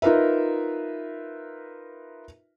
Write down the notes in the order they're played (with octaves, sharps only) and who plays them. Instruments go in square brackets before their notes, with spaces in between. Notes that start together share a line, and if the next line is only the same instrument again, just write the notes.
[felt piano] D#4 F4 A#4 B4 E5